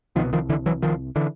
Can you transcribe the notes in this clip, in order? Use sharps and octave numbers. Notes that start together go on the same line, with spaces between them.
C2 B2 D#3 F3
D#3 F3
D3 E3
E3 F#3
D#3 F3
D3 E3